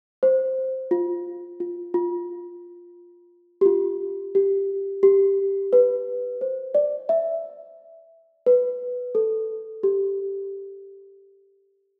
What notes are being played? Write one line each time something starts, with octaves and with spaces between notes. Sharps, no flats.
C5
F4
F4
F4
G4
F4
G4
G4
B4
C5
D5
E5
B4
A4
G4